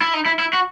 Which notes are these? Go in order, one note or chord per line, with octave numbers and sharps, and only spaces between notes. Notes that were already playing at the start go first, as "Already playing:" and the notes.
E4
D#4
E4
E4
F#4